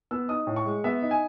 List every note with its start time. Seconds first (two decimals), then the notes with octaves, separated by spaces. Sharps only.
0.11 B3 E6
0.28 D#4 D#6
0.47 A2
0.56 C#6
0.65 G#3
0.84 B3 E5
1.02 D#4
1.11 G#5